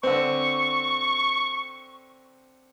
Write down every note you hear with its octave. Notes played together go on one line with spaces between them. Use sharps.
D3 C4 C#6